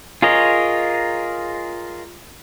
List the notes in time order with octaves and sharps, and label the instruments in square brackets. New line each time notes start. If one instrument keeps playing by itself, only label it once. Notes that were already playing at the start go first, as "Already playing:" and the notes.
[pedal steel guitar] F4 G#4 A#4 C#5 D#5